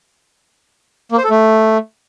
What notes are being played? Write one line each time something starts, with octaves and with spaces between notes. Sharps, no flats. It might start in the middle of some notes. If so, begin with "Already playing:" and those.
A#3
C5
A4
A3